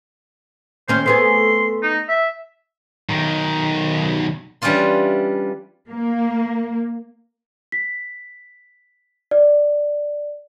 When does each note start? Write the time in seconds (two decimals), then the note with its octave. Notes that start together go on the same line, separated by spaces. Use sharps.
0.88 D#2 C4 C#4 C5
1.06 A3 B3 G#4 C6
1.83 D#4
2.09 E5
3.09 B1 D#3
4.62 E3 G3 C#4 D4 F4 C6
5.90 A#3
7.72 B6
9.31 D5